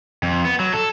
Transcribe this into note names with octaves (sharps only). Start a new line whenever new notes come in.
F2
B3
F#3
A4